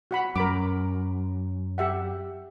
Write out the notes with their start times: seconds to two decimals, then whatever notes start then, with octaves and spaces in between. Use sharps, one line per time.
0.11 F#4 F#5 B5
0.36 F#2 A#4 B5 D6
1.78 G4 E5 F#5